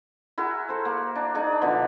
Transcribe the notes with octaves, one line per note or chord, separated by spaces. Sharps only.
E4 F#4 G#4 A#4
A4 C5
A#3
D4
D4 D#4 G#4
B2 D3 E3 F3